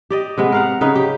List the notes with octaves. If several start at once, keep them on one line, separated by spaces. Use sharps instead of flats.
G4 D5 D#5
C3 G#3 B3
A#4 F5 F#5
C#3 D#4 B4
G4